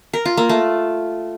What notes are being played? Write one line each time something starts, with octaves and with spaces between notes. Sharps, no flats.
A#4
F4
A#3
A3